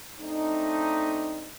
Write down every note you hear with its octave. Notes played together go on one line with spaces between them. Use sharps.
A3 C4 D4 D#4